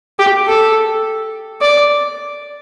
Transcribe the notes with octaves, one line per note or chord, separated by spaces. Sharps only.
G4
A4
D5